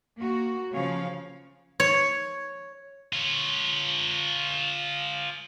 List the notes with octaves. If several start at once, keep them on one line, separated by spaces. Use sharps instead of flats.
A#3 F#4
C#3 F3 C#5 F5
C#5
F4 C#5